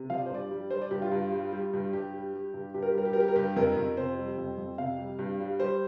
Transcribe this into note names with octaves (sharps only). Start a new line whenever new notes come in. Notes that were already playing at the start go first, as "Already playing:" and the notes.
Already playing: C3
F3 F5
D5
C5
G2 D5
G3
G3 C5
D5
G2 G4
F4
G2
G3
G3
G2
G2 G4
G3
G3
G2
G2 G4
A#4
G4
G3 A#4
G4
A#4
G3 G4
A#4
G2 G4
F2 A#4
F2
C3 C5
G3
F2
F2
C3 F5
G3
G2
G3
G3 C5